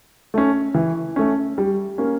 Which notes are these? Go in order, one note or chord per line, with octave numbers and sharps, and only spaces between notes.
A3 C#4
E3
A3 C#4
G3
A#3 C#4